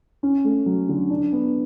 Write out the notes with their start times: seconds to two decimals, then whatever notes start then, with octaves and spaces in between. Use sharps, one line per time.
0.23 C#4
0.44 A3
0.66 F#3
0.89 D3
1.10 D4
1.33 B3